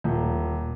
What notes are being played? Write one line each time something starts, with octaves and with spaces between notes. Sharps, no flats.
D#1